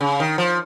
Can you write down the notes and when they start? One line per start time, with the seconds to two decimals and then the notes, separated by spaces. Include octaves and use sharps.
0.01 C#3
0.20 D#3
0.38 F3